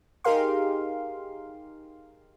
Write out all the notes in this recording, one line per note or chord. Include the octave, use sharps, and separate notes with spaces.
D#4 G4 G#4 A#4 F5 C6